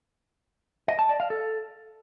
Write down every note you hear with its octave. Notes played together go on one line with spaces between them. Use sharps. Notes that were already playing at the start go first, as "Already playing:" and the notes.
D#5
A5
D5
F5
A4